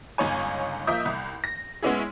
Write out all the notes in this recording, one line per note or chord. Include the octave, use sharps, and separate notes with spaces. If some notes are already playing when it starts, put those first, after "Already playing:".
G1 C#2 D#4 C#5 G#5
F3 A#3 D#5 E5 D#6 G6
C2
A#6
G#3 B3 C#4 E4 G#4